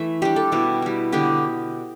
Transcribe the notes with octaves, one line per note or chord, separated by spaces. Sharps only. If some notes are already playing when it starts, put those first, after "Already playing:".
Already playing: E3 A3 E5
G3 D4 G4
A4
B2 G3 E4
G3 E4
D3 B3 D4 G4